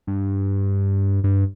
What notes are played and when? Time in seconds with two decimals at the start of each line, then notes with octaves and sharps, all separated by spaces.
0.07 G2
1.24 G2